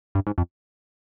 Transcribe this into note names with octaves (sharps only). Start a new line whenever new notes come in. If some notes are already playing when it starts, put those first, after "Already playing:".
G2
G#2
F2